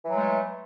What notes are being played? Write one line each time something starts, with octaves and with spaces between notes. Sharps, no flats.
E3 F#3 G#3 A3